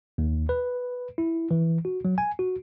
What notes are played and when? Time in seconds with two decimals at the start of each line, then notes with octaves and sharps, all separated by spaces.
0.18 D#2
0.49 B4
1.18 E4
1.51 E3
1.85 F#4
2.05 F#3
2.18 G#5
2.39 F#4